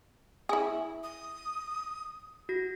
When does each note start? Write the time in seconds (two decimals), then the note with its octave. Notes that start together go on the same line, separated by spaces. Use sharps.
0.49 E4 G#4
1.03 D#6
2.49 F#4 A#6